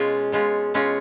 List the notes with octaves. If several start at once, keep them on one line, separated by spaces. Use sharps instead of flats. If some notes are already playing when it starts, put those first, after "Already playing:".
Already playing: B2 G#3 C#4 F4
B2 G#3 C#4 F4
B2 G#3 C#4 F4